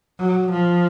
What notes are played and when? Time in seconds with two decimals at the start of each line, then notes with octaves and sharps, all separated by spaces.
0.20 F#3
0.51 F3